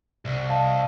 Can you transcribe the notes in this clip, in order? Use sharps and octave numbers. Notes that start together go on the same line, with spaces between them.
C2
D#5 F5 A5